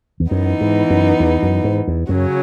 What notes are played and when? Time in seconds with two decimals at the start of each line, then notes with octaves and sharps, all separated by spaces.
0.20 E2
0.31 F#2 E3 B3 D#4
0.61 G#2
0.90 F#2
1.20 E2
1.43 F#2
1.64 G#2
1.88 E2
2.09 F#2 C#3 F#3 C#4